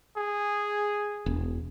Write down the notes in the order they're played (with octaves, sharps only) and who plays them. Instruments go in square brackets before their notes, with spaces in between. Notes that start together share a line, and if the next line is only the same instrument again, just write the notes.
[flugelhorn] G#4
[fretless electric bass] E1